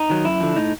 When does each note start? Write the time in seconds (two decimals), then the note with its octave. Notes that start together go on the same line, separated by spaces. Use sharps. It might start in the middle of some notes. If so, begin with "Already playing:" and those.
Already playing: D#4
0.10 D#3 F#3
0.25 F#2 E4
0.41 D3 F3
0.56 A2 D#4